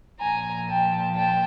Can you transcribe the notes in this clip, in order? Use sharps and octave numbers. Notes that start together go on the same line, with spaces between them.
A#2 F3 G#5 A#5
G5 A5
G5 A5